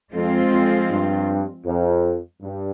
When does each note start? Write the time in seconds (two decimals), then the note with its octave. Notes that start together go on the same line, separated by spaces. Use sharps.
0.13 F2 F3 G#3 C4 F4
0.51 F2
0.90 G2
1.65 F2
2.41 G2